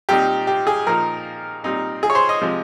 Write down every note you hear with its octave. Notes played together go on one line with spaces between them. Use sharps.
A#2 G3 C4 D#4 G4
G4
G#4
A#2 F3 A#3 D#4 A#4
A#2 G3 C4 D#4
G#4
C#5
C5
D#5
C3 F3 G#3